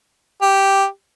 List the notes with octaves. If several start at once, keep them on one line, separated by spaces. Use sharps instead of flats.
G4